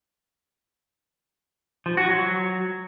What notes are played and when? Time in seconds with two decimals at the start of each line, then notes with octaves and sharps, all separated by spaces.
1.86 F3
1.97 F#4
2.09 F#3